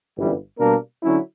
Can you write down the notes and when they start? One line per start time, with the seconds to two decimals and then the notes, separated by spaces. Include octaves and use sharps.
0.16 G1 F#2 E3 G3
0.59 B2 G3 A#3 D4 A#4
1.03 D3 F#3 C#4 E4